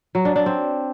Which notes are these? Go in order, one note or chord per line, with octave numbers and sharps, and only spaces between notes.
F#3
D4
D4
C4